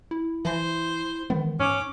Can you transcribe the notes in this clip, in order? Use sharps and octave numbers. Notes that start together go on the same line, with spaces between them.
E4
E3 C5
D#3 E3 G#3 B3
G#2 C#4 D6